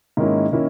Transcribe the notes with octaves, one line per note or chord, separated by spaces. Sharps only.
G#2 D#3 A#3 C#4 E4
D#3 A#3 C#4 E4